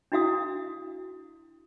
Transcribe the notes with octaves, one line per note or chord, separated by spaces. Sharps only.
D4 E4 F#4 F5 D#6